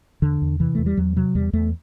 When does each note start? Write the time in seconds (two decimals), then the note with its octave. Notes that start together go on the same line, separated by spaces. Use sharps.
0.22 E2 D3
0.42 E2
0.60 C3 E3
0.75 E2 A3
0.86 G3
0.97 E2 F#3
1.16 C3 F#3
1.35 E2 G3
1.53 E2 A3